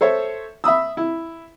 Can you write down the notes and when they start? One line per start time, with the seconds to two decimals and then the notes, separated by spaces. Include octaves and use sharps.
0.01 A4 C5 C#5 E5
0.64 E5 B5 D#6 E6
0.97 E4